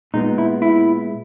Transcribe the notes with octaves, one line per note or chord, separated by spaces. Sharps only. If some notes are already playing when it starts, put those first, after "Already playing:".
A#2 G#3 B3 D#4
E4
E4